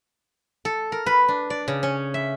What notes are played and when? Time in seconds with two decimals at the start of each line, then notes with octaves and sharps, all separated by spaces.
0.65 A4
0.92 A#4
1.06 B4
1.28 D4
1.50 D5
1.68 C#3
1.83 C#4
2.14 E5